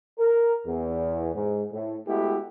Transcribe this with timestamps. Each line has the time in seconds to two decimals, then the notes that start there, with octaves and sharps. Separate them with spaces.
0.19 A#4
0.66 E2
1.34 G#2
1.71 A2
2.07 G#3 A3 B3 E4 F#4 G4